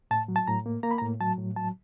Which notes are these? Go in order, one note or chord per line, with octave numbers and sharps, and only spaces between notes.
A2 A5
F#3
A5
A2 A#5
A#3
A#3 A#5
B5
A#5
A2
F#3 A5
A2
F#3 A5